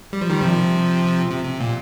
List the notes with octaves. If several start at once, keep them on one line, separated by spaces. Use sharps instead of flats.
G3
F3
D#3 G3
C3 F3
C3
C3
A#2